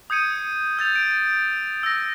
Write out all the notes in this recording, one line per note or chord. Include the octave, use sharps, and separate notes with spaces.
D#6 G6 G#6 C#7 D#7
E6 G6 A6 F7
D7
E6 A#6